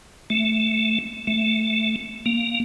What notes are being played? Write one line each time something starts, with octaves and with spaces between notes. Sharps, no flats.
A3
A3
A#3